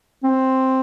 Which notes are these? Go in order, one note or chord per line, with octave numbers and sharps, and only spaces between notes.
C4